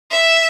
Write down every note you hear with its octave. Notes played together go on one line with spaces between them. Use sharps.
E5